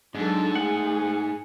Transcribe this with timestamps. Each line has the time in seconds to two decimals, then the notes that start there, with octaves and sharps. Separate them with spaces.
0.15 G#2 F#3 G#3 D4 A4
0.55 A3 G#4 F#5 D#6